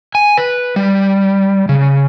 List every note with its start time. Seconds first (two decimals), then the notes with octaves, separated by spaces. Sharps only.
0.15 G#5
0.37 B4
0.76 G3
1.69 C#3